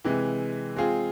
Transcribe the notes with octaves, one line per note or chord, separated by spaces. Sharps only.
C3 E3 G#3
G#3 C4 F4 G#4